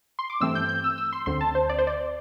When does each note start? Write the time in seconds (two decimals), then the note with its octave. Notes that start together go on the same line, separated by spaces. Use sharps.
0.19 C6
0.30 D6
0.40 G2 E3 A3 C4 E6
0.55 G6
0.69 G6
0.84 E6
0.98 E6
1.13 C6
1.26 D2 D3 C4 C6
1.41 A5
1.55 C5
1.69 D5
1.79 C5
1.87 D5